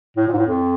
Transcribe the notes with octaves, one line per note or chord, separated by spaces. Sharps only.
A2
A#2
G#2
A2
F2